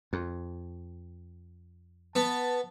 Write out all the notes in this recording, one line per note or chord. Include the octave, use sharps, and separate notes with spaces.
F2
B3 A5